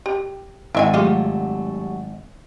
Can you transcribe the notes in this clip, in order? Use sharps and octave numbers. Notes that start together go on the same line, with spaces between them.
G4
G#1 E4 E5 G#5
F#3 G3 A3 F4 G4 G#4